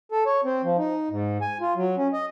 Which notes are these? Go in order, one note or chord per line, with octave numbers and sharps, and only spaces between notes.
A4
C#5
C4
F3
D#4
G#2
G#5
F4
F#3
C#4
D#5